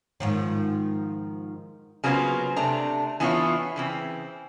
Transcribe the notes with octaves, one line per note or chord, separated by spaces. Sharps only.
G#2 D#3 F3
C#3 F#3 A#3 B3 F4 C5
C3 A3 D4 A#5
E3 B3 D4 E4 F4 C#5
C#3 E3 C4